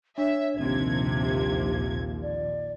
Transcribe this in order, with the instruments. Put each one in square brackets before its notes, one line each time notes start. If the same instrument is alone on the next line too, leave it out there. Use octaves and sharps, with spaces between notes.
[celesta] D4 [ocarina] C#5 [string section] E5
[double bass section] A#1 D#2 F3 [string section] C3 G#6 [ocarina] C4
[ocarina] G4
D5